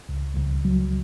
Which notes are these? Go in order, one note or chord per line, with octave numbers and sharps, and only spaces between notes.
C#2
C#2
F#3